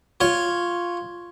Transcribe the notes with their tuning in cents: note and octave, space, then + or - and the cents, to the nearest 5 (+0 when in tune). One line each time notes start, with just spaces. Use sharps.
F4 +0 C#5 +0